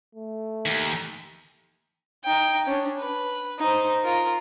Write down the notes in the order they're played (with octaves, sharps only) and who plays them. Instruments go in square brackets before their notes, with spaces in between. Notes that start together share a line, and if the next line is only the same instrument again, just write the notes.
[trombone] A3
[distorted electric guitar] D#2
[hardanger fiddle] D#4 G5
C#4 D4
B4
D#4 C5
F4 A#4